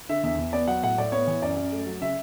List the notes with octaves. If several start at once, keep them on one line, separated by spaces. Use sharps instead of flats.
D3 E5
E2 E5
E2
B3 D5
F#3 F#5
A2 F#5
A2 D5
B3 C#5
E3
F#2 D5
F#2
A3
F#3
C#3 E5